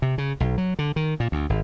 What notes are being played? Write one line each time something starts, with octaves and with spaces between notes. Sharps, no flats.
C3
C#3
B1
F#3
D3
D#3
A#2
D2
G#1